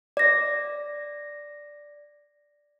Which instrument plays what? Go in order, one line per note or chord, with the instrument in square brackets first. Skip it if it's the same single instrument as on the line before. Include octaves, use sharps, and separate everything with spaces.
[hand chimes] D5 A#6